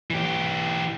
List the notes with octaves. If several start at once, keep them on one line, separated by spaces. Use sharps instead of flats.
E3 G4